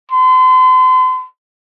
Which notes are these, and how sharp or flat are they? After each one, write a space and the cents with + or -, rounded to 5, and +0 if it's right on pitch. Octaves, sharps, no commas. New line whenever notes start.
C6 -40